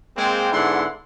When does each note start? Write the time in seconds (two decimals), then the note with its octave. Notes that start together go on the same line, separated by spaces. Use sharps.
0.16 G#3 A#3 C4
0.52 G#2 D3 B3 E4 F#5 C6